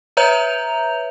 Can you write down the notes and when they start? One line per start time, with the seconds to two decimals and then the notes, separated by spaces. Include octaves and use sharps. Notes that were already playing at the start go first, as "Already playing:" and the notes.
0.17 B4 C#5 E5 A#5 G6 F7